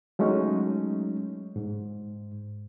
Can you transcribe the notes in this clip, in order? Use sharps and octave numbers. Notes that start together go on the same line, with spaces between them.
F#3 G#3 A3 C#4 D#4
G#2